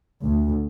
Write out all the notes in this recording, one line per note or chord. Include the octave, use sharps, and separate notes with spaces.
D2